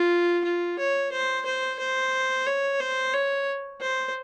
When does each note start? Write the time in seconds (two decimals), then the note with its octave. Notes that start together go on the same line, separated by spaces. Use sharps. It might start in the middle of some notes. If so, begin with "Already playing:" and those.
Already playing: F4
0.44 F4
0.79 C#5
1.12 C5
1.45 C5
1.79 C5
2.46 C#5
2.80 C5
3.14 C#5
3.81 C5